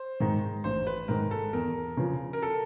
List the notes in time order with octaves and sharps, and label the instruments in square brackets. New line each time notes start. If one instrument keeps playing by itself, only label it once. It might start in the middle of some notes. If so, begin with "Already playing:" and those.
Already playing: [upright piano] C5
[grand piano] G#2 D#3
[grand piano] A1 [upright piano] C5
[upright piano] B4
[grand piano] G#2 D#3 [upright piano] A#4
[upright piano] A4
[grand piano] E2 [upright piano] A#4
[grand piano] C#3 F3
[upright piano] A#4
A4